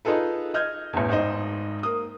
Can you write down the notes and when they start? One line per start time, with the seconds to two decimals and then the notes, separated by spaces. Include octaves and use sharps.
0.05 D#4 F4 G#4 A4 B4
0.54 D#5 F6 G6 G#6
0.93 A1 E2
1.09 G#1 G#2 C5 D#5
1.83 A#3 D#6